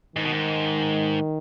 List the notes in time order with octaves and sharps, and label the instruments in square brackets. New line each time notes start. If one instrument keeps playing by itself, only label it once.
[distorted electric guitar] G#2 [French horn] D#3
[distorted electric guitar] B2
G#2